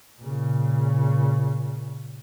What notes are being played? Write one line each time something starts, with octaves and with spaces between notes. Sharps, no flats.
A#2 C#3